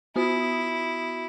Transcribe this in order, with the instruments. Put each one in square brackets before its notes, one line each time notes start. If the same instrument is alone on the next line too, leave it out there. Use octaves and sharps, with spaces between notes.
[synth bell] B3 F#4 D#6 [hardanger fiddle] E4